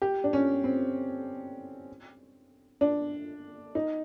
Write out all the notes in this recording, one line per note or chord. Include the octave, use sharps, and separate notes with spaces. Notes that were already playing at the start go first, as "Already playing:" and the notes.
G4
D4
C#4
C4
D4
D#4